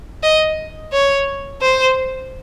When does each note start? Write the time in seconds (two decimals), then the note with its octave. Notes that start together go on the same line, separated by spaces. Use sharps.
0.23 D#5
0.93 C#5
1.62 C5